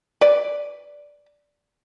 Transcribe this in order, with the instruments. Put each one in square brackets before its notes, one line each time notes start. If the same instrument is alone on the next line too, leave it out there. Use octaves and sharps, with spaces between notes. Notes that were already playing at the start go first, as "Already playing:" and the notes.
[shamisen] B4 D5